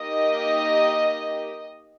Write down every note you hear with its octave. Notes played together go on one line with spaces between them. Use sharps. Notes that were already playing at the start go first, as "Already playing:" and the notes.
Already playing: A#3 D#4 G4 D#5